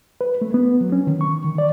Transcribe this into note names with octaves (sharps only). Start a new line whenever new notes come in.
B4
A3
B3
F#3
C#4
D#3
C#6
D#3
D5